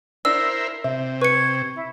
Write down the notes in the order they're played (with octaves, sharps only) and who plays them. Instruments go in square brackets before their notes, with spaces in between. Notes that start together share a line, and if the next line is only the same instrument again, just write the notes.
[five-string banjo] D4 [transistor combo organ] E4 A#4 C5 [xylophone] E6
[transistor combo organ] C3 [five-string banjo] E5
[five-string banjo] B4 [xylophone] C#6 C#7 [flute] G#6
[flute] E4